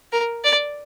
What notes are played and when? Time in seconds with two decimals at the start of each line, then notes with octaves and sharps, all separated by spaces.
0.12 A#4
0.44 D5